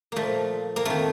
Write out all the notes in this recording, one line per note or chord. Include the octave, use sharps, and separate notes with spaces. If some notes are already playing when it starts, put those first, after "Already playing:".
A#2 F3 A3 A#3
A#3
F2 D#3 A3